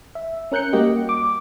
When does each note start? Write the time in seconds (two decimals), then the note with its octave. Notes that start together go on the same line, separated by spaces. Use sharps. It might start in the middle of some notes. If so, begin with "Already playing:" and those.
0.15 E5
0.52 C#4 A#4 F#6 G6 C#7
0.73 G3 A#3 F#4 G4 D#5
1.09 D6